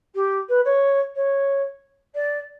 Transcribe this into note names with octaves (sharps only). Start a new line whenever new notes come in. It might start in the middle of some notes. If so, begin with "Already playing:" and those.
G4
B4
C#5
C#5
D5